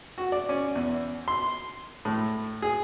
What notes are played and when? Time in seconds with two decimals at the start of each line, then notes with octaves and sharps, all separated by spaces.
0.18 F#4
0.32 D5
0.49 C#4
0.76 E2
1.28 C6
2.05 A2
2.62 G#4